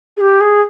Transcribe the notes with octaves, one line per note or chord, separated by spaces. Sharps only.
G#4
G4
G#4